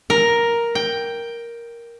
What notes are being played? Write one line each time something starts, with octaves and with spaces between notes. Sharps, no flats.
A#4
G5